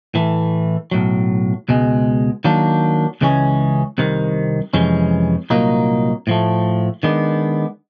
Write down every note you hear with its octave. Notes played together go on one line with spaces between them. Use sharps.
A2 E3 A3
B1 A2 F#3
C#2 B2 G#3
D#3 F#3 A#3 D4
C#2 C#3 E3 G#3 C#4
C2 C3 D#3
F2 C3 E3 G#3 C#4
C2 A#2 F#3 A#3 D#4
A2 F3 A3
D#3 G#3 B3 D4